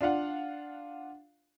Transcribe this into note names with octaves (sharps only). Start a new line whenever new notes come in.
D4 F4 F5 F#5